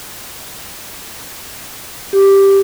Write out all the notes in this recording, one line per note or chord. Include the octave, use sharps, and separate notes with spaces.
G4